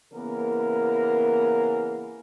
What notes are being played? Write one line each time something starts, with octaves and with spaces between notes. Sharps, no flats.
C#3 E3 A#3 B3 A#4